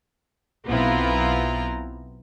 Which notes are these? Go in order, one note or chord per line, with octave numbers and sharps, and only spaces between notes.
B1 B3 C4 E4 F4 A#5